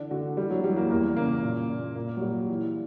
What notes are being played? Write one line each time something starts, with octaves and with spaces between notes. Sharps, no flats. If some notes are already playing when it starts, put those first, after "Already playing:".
Already playing: D3 E3 D4
D3 F#4
E3 G3
F#3
E3 G3
A#3
E2 A#3
C#3 A#3
A#2
A#2
A#2 A#3
F#3
A#2 G3
E3